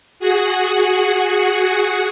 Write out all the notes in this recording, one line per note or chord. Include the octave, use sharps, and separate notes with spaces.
F#4 G#4 F#5